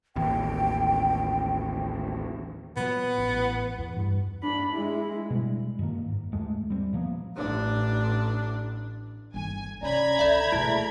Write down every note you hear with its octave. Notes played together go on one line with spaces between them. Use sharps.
A1 D#2 G5
A#2 F#3 B3
A1
E2
G2
D4 B5
G#3 E4
B2 G3 G#3
F#2 D#3 A#3
G#2
D#2 G#3 A3
G3 C4
A#2 F3 A#3 B3
A1 D4
G1 D#3 G#5
C3 C#4 D5 A#5 B5 G#6
C#2 D3 D5 E5
E1 A#2 E3 G#3 A3 E4